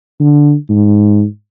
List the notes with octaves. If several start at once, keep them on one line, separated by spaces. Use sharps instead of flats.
D3
G#2